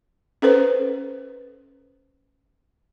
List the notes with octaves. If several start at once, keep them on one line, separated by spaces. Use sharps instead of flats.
C#4 A4 B4 C5